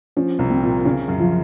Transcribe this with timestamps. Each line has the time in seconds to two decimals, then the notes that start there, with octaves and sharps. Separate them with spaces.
0.17 F3 C#4
0.39 C2
0.50 C4
0.62 A#2
0.85 C#3 C#4
1.08 F#2
1.20 F3